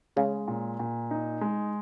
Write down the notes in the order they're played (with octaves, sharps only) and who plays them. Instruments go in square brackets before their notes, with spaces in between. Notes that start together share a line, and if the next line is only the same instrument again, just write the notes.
[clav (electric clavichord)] C#3 [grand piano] G#3
[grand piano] A#2
A#2
D#4
G#3